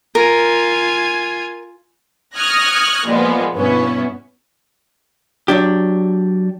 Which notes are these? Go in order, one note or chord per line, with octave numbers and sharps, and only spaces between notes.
F4 A#4 G#5
C#6 D#6 F6 F#6 G#6 A#6
A#2 F3 G3 G#3 B3
G2 B2 B3 C#4 E4
F#3 D4 G4